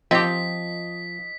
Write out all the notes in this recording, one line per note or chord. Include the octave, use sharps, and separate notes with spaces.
F3 C4 G4 D#5 B6